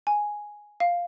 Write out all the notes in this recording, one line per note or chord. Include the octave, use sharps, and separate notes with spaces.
G#5
F5